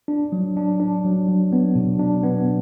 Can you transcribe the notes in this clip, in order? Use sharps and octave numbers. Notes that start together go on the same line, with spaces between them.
D4
F#3
D4
D4
F#3
F#3
B3
B2
D4
B3